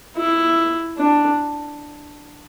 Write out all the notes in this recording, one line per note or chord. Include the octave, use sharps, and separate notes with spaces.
E4
D4